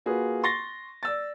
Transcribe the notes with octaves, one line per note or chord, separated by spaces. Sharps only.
A#3 F4 F#4 G#4 B4
C6 C#6 A6 A#6 G7
D5 E6 A6